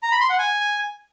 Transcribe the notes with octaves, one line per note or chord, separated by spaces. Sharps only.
A#5
B5
C6
F#5
G#5